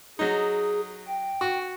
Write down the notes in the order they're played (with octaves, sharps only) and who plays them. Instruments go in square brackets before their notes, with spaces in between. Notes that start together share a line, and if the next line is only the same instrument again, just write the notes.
[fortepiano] F#3 D#4 [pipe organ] G#4
[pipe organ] G5
[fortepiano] F#4